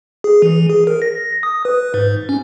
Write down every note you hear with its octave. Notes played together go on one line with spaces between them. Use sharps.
G#4
E3
G#4
A#4
A#6
D#6
B4
G#2
C#4